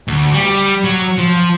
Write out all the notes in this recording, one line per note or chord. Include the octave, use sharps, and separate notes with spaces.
D2
G3
F#3
F3